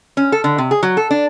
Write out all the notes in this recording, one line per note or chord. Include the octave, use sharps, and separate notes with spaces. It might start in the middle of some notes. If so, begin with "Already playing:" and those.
C#4
A4
D3
C3
G#4
F#3
A4
D4